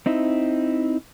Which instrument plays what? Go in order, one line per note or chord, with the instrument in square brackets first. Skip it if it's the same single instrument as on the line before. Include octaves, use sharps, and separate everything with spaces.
[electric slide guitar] C4 D#4 E4